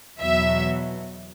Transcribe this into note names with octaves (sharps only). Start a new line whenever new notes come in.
E2 B2 F#3 E5